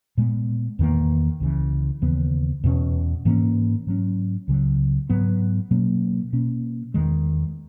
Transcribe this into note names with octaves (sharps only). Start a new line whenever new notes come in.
A#2 G#3 B3
E2 D#3 A#3
C#2 C#3 E3
D#2 C#3 E3 B3
E2 B2 A#3 C#4
G#2 E3 A#3 C#4
G#2 F#3 C#4
C#2 C#3 F#3
G#2 F#3 B3
B2 F#3 A#3 C#4
B2 A#3 C#4
E2 D#3 G#3